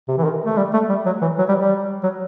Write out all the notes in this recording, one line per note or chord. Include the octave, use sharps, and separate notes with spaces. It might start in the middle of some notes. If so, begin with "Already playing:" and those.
C3
E3
D#3
A3
G3
A3
G3
F#3
E3
F#3
G3
G3
F#3